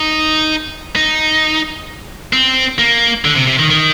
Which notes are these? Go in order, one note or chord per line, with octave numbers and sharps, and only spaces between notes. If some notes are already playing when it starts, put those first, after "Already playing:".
Already playing: D#4
D#4
C4
A#3
D3
C3
C3
D#3
D#3